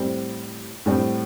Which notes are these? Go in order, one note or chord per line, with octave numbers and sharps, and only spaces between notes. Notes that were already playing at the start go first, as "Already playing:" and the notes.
Already playing: A2 G3 C4
A2 G3 C4